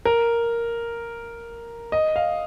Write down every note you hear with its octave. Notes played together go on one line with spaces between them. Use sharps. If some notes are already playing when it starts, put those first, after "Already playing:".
A#4
D#5
F5